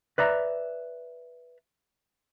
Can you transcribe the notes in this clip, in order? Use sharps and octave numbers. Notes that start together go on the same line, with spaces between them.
B4 D5 E5 A#5